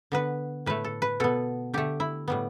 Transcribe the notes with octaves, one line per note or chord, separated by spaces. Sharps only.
D3 B3 B4
A2 A3 B4
A4
B4
B2 B3 A4
D3 A3 G4
E4
A2 G3 B3